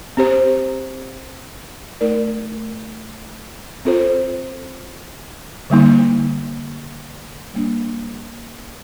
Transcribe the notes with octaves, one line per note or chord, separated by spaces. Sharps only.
C4 G4 C5
A3 D#4 A#4 D5
C4 F4 A4 C5
D3 G3 A#3 D#4
G3 A#3 D4